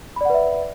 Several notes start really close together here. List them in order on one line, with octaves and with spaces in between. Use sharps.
B5 D5 F#5 B4 E5